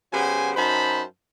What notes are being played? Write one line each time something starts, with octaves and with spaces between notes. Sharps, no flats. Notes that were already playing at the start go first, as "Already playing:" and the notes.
C#3 F#3 B3 G4 C5 G#5
F#2 D#4 C5 A5 B5